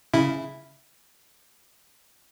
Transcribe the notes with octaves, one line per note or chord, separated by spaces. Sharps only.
C#3 E4